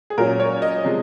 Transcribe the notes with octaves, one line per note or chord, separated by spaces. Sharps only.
G#4
A#2 F#3 C#4 A#4
C#5
D#5
C3 F3 G#3